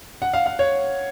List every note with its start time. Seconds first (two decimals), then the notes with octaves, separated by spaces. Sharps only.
0.22 F#5
0.34 F5
0.46 F5
0.59 C#5